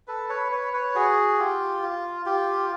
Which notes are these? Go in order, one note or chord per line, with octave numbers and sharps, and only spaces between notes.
A4 B4
B4 C#5
B4 C#5
B4 C#5
F#4 G#4
F4 G4
F4
F4 G4